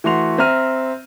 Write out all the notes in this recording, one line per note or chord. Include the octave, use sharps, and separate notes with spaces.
E3 A3 F#4 C6 F7
C4 E5 A#5 F6 D#7